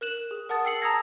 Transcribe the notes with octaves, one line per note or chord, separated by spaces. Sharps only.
A#4 F#6 E7 F#7
G#4
A#4 F#5 A5 D#6 A6
G5 E6 C7 C#7 F#7
A5 A#5 D#6 E6 G#6 A#6